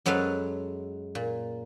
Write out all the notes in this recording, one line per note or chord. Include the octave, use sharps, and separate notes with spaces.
F#2 F#3 G#3 A4 B4 F5
A#2